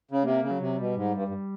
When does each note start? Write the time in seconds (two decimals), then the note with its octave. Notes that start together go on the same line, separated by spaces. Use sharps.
0.11 C#3
0.24 C3 A#3
0.41 C#3
0.51 F#3
0.60 C3
0.78 B2 G3
0.96 G#2
1.15 G2
1.28 G2